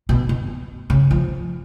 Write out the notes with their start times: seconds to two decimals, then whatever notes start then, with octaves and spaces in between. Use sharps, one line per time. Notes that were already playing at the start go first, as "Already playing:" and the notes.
0.09 B2
0.29 B2
0.90 C#3
1.11 F3